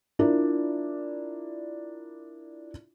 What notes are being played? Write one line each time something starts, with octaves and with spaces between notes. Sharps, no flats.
D4 E4 F4 A#4 D5